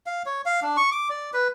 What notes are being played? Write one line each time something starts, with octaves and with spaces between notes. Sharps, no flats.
F5
C#5
F5
D4
C#6
D6
D5
B4